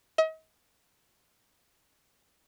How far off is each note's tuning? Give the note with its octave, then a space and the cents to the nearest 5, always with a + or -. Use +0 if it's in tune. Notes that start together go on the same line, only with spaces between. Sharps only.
D#5 +40